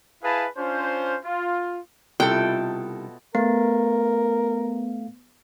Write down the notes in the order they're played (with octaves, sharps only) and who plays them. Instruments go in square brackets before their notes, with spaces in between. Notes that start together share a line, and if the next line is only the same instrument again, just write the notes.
[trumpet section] E4 G#4 B4 F5 A5
C#4 D4 F4 C5
F4
[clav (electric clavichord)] C2 [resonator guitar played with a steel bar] B2 A4 [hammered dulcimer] F4 D#5 E5 [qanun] G5
[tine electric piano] A3 F5 [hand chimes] B3 [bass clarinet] A#4